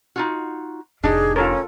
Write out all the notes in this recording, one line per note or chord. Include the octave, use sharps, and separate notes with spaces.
D#4 F4 F#4
F1 A2 D4 D#4 G4 G#4
C#4 F4 A4 A#4